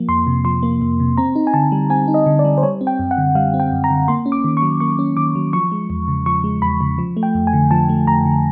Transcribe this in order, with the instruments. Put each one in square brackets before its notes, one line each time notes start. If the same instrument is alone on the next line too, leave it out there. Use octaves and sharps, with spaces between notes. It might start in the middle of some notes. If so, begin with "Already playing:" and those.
Already playing: [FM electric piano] F3 A#3
F2 C6
C3
F3 C6
A#3
F2
C3
C4 A#5
D#4
G#5
D3 A5
G3
C4 G#5
D#4
D#5
D3
D5
G3
C5
G3 C#5
C4
G5
F#2
F#5
D3
G3 F5
C4
G5
F#2
A#5
D3
A#3 C6
C#4
D6
D#3
C#6
F#3
A#3 C#6
C#4
D#3 D6
F#3
F3 C#6
G#3
E2
C#3
F3 C#6
G#3
E2 B5
C#3
F3
A3
G5
F2
G#5
D3
F3 A5
A3
F2 A#5
D3